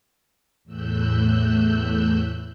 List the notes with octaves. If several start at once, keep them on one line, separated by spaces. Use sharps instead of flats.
E2 A2 E6 F#6 G6